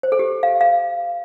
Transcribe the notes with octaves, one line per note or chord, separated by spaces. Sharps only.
C5
A4
G4
F5
F5